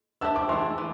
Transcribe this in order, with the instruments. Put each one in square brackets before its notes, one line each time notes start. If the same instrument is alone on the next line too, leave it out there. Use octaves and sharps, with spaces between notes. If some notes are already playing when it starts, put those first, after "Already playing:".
[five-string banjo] D4 G4 C5 E5 [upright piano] E6
[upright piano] D6
[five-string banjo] E3 A3 E4 [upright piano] C6
[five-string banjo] E3